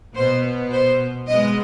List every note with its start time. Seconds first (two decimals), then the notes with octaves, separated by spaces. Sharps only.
0.15 B2 B3 C5
0.71 C5
1.27 B2 G#3 B3 D#5